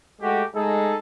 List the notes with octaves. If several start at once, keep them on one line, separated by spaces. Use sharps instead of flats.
G#3 A3 F#4 G4
G#3 A3 D#4 G#4 A4